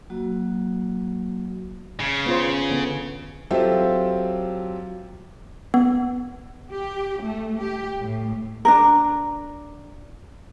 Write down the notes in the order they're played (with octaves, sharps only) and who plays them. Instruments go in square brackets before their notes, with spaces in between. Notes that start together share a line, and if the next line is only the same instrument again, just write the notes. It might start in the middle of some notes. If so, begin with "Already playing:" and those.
[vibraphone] F#3 A#3 F#4
[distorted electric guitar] C#3
[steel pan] B3 F4 C5
D3 B3
[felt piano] F#3 C4 F4 G4 A4 E5
[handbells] B3
[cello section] G4
A3
G4
A2
[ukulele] D4 D#4 A#4